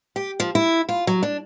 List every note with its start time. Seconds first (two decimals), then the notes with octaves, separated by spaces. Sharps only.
0.16 G4
0.40 F3
0.55 E4
0.89 F4
1.07 F#3
1.23 D4